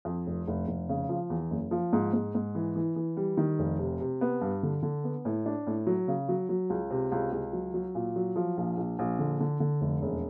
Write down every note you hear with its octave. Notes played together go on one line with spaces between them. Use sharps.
F2
F1
F1
F1
C#3
F3
E2
F#1
F3
G#2
G#2
G#2
E3
E3
E3
G3
D#3
F1
C3
C3
B3
G2
D3
D3
B3
A2
D4
A2
F#3
C#3
F#3
F#3
C#2
C3
C#2
C#2
F#3
F#3
A#2
F#3
F3
A#1
A#1
A#1
D3
D3
D3
F1
E1